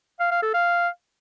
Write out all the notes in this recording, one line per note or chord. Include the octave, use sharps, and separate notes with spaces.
F5
F5
A4
F5